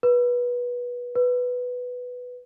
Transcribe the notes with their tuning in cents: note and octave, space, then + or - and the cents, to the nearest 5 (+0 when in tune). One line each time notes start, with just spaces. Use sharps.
B4 -20
B4 +0